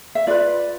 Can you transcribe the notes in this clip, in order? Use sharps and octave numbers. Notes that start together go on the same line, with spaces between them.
E5
F4 B4 D5